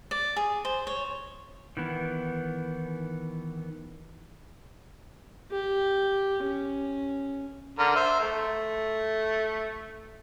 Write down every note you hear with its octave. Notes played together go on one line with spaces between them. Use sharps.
D5
G#4
C5
C#5
D#3 E3 B3
G4
C#4
D3 A#4
C5 E5
A3